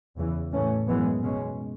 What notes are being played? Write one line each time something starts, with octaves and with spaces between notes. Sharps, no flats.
E2 C#3 E3
A2 E3 A3 C#4
F#2 E3 G#3 B3
B2 G#3 C#4